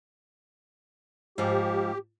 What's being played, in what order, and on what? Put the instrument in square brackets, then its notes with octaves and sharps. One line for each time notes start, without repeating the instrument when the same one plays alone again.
[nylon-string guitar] G#2 F3 [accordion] G4